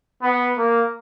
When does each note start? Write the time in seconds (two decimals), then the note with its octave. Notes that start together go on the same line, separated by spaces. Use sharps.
0.22 B3
0.57 A#3